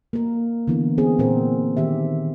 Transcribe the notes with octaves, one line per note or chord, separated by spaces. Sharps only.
A#3 A#4
D3 E3 B3
B3 C4 E4 G#4
A#2 C4 A#4
D#3 G4 E5